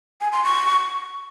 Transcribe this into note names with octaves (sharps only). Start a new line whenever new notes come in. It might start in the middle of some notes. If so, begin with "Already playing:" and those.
G#5
C6
C#6